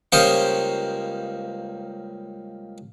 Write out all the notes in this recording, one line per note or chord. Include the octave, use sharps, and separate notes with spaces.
C#2 G3 A#3 C5 C#6 D#6